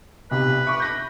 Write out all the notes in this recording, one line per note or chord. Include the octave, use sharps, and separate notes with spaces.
B1 C3 B4
E5 C#6 D6
G6 A#6